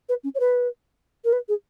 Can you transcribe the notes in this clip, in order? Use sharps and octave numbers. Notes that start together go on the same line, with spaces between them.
B4
C#4
C#5
B4
A#4
B4
G#4